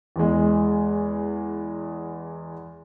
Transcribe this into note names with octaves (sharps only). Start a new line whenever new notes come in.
E2 G#3